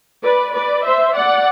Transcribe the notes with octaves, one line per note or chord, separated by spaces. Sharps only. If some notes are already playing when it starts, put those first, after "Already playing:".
B4 D5
B4 D5
C5 E5
D5 F#5